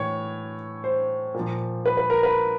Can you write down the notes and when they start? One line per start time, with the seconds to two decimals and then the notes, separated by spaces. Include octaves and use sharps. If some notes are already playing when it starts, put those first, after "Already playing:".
Already playing: A2 E3 C#5
0.84 C5
1.34 A#2 F3
1.86 B4
1.97 B4
2.10 A#4
2.23 B4